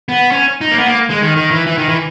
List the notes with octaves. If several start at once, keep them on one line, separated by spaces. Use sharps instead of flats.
B3
C#4
D#4
A#3
B3
A#3
G#3
D#3
D#3
E3
E3
D#3
E3